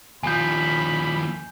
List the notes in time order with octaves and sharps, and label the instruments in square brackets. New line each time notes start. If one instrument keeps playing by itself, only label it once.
[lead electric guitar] D#2 F3 [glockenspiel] G#5 G6 [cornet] B5